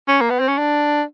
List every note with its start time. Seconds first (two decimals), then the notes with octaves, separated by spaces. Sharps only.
0.08 C#4
0.21 A#3
0.30 B3
0.40 C4
0.48 C#4
0.58 D4